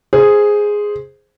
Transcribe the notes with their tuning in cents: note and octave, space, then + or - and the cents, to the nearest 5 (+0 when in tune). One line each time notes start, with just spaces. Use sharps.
G#4 +0 C5 +0